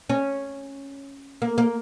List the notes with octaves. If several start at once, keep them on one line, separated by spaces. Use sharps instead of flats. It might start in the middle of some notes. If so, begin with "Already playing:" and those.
C#4
A#3
A#3